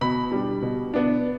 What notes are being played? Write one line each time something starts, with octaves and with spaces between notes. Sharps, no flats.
B2 B5
G3 D4
B2
B3 D4